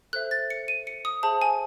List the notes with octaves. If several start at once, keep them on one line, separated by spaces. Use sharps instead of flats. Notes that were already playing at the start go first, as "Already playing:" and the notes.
A4 C5 E5 F#6
A6
C#7
D#7
C#7
D#6
G#4 C5 E5 A5
G#5